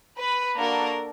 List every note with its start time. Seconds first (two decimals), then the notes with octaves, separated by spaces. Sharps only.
0.19 B4
0.57 A#3 D4 F#4 A4 A#4